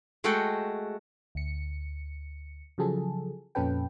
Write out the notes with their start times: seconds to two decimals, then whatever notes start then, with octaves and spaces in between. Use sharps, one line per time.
0.24 G#3 A3 F#4 A4 F#5 G5
1.35 D2 C#7
2.78 C#3 F3 F#3 G#4 A4
3.55 F2 A#2 C#4 A4 B4 G5